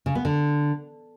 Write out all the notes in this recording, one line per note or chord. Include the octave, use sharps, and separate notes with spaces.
C#3
B3
D3